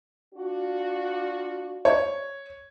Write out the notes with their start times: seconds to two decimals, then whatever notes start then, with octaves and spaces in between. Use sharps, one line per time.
0.34 D4 F4 F#4
1.85 C#5